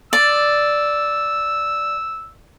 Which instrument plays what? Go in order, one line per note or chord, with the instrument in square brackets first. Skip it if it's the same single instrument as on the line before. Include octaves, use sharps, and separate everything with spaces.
[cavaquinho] D5 [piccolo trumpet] E6